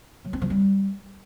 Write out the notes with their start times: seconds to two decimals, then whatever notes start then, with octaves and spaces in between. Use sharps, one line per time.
0.25 F#3
0.33 C4
0.42 F3
0.50 G3